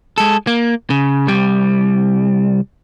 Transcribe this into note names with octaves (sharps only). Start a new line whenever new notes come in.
G#3 A4
A#3
C#3
C2 G3